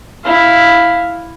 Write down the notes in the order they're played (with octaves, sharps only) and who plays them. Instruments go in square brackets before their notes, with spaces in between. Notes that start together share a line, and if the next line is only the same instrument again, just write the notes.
[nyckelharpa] E4 F5